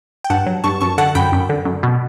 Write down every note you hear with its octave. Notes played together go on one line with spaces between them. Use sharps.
G5
G2 F#5 A5
F#3
G2 A5 C#6
F#2 A5 C#6
D3 F#5 A5
F#2 G5 B5
F#2
D3
F#2
B2